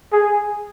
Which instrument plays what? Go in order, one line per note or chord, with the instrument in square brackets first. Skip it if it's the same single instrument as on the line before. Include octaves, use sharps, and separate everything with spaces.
[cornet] G#4